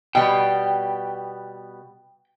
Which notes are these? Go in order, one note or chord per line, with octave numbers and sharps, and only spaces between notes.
B2 G3 B3 G5